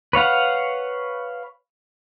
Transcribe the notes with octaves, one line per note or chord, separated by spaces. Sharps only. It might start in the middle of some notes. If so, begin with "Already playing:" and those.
B4 C#5 F5 F#5